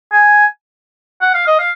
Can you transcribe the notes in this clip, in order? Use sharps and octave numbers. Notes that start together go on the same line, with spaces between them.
G#5
F#5
F5
D#5
F5